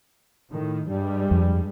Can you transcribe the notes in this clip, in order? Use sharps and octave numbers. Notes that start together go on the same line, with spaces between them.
A2 D#3
G2 G3 G#3
F2